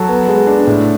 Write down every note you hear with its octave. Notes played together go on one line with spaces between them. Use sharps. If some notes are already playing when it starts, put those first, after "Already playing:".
Already playing: F#3 F#4 A4
B3
G#3
D4
A2